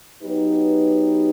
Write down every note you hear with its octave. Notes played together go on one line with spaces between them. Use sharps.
F#3 B3 D#4 G4 B4